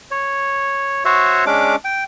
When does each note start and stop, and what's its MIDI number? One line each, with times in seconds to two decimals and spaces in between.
0.11 1.04 73
1.05 1.45 66
1.05 1.45 72
1.05 1.45 73
1.05 1.45 76
1.46 1.76 56
1.46 1.76 61
1.46 1.76 62
1.46 1.76 86
1.85 2.04 79